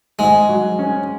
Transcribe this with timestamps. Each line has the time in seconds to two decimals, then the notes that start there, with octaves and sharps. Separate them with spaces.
0.19 G#2 G#3
0.49 F#3
0.79 C#4